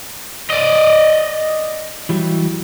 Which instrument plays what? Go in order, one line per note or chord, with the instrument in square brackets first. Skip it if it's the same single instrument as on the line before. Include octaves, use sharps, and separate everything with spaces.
[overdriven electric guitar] D5 D#5
[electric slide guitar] E3 F#3 G3